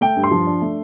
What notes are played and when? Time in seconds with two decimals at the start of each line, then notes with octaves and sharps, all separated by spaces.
0.01 A3 G5
0.16 G2
0.24 C6
0.31 F3
0.47 D4
0.62 A3